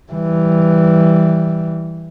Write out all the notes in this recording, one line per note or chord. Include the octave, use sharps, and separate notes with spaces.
E3 G3